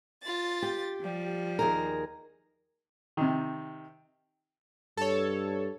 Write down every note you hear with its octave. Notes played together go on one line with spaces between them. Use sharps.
F4 A6
G4
F3 G3
D#2 G#4 A#4
C3 D#3
G2 A4 C#5